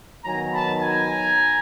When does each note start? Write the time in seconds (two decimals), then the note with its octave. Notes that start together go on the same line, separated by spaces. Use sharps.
0.24 D#3 F#3 B3 G#5 A#5
0.53 A5 B5
0.82 G#5 A#5